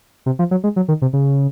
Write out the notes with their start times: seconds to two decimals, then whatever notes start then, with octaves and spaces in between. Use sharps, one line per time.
0.26 C3
0.39 F3
0.51 F#3
0.64 G#3
0.76 F#3
0.88 D#3
1.02 C3
1.13 C#3